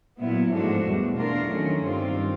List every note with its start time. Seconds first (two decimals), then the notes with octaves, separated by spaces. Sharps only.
0.19 A#2 F#3 B3 E4
0.51 G#2 F3 A3 D4 F#4
0.84 E2 B2 G3
1.18 A3 D4 F4 A#4
1.51 D#3 F#3 A3 C#4
1.84 G2 D#3 G3 C4 F4